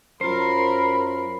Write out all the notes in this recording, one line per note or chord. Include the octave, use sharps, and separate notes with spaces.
F#2 F4 A#4 C5 B5